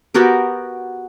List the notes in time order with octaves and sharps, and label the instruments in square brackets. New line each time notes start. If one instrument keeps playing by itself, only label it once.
[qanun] B3 F#4 G4 A#4